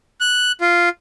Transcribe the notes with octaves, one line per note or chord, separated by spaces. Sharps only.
F#6
F4